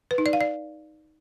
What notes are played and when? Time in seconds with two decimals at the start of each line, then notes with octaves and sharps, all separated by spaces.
0.11 B4
0.18 D#4
0.26 D5
0.33 F5
0.41 D5